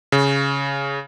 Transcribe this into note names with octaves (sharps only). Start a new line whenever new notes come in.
C#3